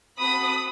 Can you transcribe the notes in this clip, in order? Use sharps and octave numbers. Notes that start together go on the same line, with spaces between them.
C4 F#4 A4 B5 D#6